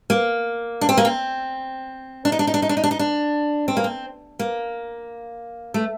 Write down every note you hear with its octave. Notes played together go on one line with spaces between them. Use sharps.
A#3
D4
C4
A#3
C4
D4
D#4
D4
D#4
D4
D#4
D4
D#4
D4
D#4
D4
C4
A#3
C4
A#3
A3